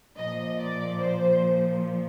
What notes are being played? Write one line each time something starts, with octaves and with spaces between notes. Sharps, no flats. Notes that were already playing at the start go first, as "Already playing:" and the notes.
A#2 F3 D#5
D5
C5